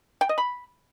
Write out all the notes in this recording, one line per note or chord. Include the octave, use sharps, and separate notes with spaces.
G5
D#5
B5